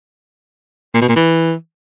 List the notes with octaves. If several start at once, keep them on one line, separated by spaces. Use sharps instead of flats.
A#2
B2
A#2
E3